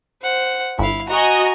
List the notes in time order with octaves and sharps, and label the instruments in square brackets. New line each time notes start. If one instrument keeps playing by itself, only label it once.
[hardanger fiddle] C5 F#5
[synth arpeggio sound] G1 [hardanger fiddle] E4 F5
[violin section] F#4 D#5 [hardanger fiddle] G#5 A#5